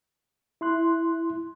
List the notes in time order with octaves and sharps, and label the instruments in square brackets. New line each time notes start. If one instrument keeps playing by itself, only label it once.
[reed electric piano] E4 C6 F#6